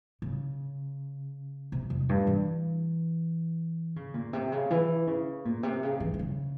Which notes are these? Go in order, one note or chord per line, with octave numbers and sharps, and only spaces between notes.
C#3
C3
F2
G2
E3
C#3
A#2
C3
C#3
E3
C#3
A#2
C3
C#3
E3
E3
C#3